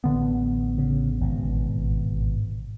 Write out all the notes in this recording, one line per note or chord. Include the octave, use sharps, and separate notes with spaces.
A1 D3 B3
C#3
G#1 B2